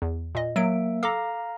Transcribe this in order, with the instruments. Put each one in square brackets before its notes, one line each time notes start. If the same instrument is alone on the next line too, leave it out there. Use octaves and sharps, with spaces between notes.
[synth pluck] E2
A#2 D#5
[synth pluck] F#3 D7 [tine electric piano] A#3 E5
[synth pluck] A4 D6 [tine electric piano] F5 A#5